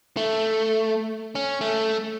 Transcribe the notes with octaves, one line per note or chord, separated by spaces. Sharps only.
A3
C#4
A3